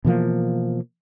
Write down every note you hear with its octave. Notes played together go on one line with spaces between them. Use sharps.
B2 E3 F3 A#3